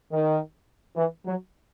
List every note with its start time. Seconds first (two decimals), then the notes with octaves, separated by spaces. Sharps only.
0.12 D#3
0.97 E3
1.25 F#3